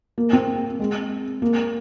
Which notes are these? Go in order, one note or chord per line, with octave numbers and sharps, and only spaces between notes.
A#3
C4
G#3
A#3